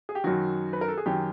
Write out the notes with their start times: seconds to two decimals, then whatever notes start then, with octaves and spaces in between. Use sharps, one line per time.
0.09 G#4
0.15 G4
0.24 F#2 D#3 F#3 F#4
0.73 B4
0.81 A#4
0.88 A4
0.98 G#4
1.06 F#2 D#3 F#3 G4